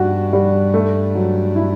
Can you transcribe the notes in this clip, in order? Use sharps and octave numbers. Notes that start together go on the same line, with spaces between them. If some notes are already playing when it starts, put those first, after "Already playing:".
Already playing: G2 F#4
G3
A3
F#3
E4